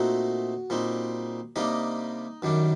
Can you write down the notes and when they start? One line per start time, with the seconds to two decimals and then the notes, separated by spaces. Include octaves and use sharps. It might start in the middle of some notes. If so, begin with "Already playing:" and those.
Already playing: A#2 A3 C4 D#4 F#4 F#5
0.70 A#2 G3 C4 D#4
1.56 C3 G3 A#3 D4 D#4 D#5
2.42 F#2 D#3 G3 D4